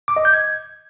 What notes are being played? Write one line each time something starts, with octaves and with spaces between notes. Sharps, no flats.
D6
D#5
G6
G#6